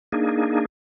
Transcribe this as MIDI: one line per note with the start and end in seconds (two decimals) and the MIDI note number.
0.12 0.65 58
0.12 0.65 62
0.12 0.65 63
0.12 0.65 68